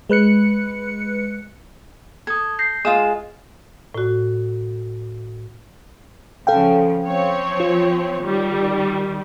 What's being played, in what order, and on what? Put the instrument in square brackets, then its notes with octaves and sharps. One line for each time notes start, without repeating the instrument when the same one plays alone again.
[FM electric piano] G#3 B4 F#6 C#7
[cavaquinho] A4 [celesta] D#6 G#6
[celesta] G6 A#6 C7
[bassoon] G#3 [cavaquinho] F4 F5 D#6 [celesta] E7
[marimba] A2 F#4
[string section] C#3 F3 [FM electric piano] A4 F5 G5
[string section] F3 C4 C#5
[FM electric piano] F4
[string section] D#3 G3